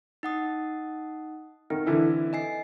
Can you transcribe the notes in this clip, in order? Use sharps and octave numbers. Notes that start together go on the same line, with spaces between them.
D#4 F#5 D#6
D#3 C4
D3 E3 E4
D#5 G#5 C7